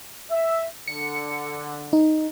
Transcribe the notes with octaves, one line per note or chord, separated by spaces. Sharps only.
E5
D3 C#7
D#4